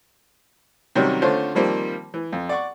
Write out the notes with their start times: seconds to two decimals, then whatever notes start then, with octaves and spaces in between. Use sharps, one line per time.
0.95 C3 D#3 F#3 G3 C#4
1.22 D3 A3 C4 C#4 F4 C5
1.55 D#3 F3 G3 A#3 C4
2.14 E3
2.32 F2
2.49 D5 F#5 C#6